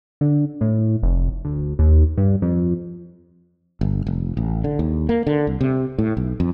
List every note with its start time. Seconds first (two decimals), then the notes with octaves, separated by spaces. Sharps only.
0.21 D3
0.61 A2
1.03 F1
1.45 D2
1.79 D#2
2.17 G2
2.42 F2
3.81 G1
4.07 F1
4.37 A1
4.64 D3
4.79 D#2
5.09 A#3
5.27 D3
5.47 C2
5.61 C3
5.98 A2
6.17 B1
6.40 F2